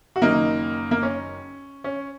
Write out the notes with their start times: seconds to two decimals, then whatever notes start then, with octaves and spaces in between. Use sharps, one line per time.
0.16 F#4
0.22 F#1 F#2 D#3 A#3 D#4
0.91 A#3
1.03 C#4
1.84 C#4